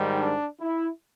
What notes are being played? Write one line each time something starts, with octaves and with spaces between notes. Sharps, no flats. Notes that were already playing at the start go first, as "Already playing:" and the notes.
Already playing: G#2 D#3 G3
D4
E4